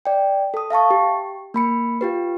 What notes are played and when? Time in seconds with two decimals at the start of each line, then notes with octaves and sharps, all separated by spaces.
0.05 D5 G5
0.54 A4 D#6
0.70 E5 F5 A5 C#6
0.90 G4
1.54 A#3 B5 C#7
2.01 F4 G4 B4